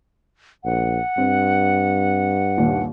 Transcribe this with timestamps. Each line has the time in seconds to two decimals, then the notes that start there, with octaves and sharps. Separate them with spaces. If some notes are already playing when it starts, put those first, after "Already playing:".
0.64 A#1 F#5
1.18 G2 C4
2.58 D#2 A#2